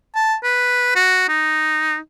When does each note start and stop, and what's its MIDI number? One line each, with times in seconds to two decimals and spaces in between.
0.15 0.36 81
0.43 0.91 71
0.96 1.24 66
1.29 1.97 63